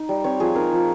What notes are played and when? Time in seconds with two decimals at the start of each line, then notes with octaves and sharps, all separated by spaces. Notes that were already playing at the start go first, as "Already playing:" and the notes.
Already playing: D#4
0.09 G3
0.24 C4 C#5
0.40 F3 G#4
0.56 D#4 A#4
0.72 F3